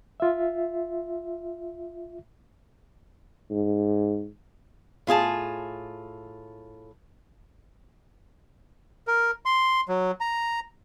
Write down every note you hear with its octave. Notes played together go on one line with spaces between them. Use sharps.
F4 E5
G#2
A2 F4 G#4 A5
A#4
C6
F#3
A#5